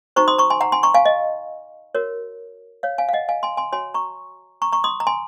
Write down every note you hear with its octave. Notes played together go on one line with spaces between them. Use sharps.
D#4 F#4 C5 A#5 C#6
C6 D#6
A#5 C#6
G#5 C6
F#5 A#5
G#5 C6
A#5 C#6
F5 G#5
D#5
F#4 A#4 C#5
C#5 F5
F5 G#5
F5
D#5 F#5
F5 G#5
G#5 C6
G#5 C6
F#4 C#5 G#5 C6
A#5 C#6
A#5 C#6
A#5 C#6
C6 D#6
A#5
G#5 C6